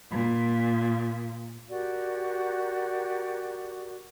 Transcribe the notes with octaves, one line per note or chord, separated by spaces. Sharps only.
A#2
F#4 G4 A#4 D5